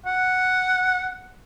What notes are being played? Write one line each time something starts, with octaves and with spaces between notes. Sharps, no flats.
F#5